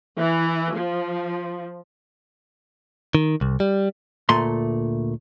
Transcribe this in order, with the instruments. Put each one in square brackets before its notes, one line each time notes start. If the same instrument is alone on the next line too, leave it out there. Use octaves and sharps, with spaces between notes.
[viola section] E3
F3
[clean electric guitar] D#3
C2
G3
[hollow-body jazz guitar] D2 A#2 A3 C6